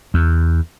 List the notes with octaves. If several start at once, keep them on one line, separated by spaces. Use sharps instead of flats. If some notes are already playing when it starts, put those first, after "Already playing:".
E2